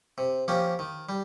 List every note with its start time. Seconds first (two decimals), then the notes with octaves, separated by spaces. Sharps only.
0.18 C3
0.48 F3 A#3 C#4 G4
0.79 D#3
1.09 G3